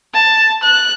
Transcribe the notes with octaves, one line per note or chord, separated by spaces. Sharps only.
A5
F#6